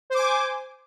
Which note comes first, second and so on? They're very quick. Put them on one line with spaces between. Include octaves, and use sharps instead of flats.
C5 D6 G#5